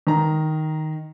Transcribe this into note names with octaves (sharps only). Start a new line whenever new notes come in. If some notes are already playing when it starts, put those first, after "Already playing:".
D#3 A#5